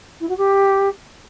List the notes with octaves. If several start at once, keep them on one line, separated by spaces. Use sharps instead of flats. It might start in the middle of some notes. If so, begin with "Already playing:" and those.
E4
F#4
G4